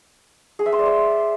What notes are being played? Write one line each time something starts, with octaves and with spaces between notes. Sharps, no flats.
G#4
E5
C6
D5
C5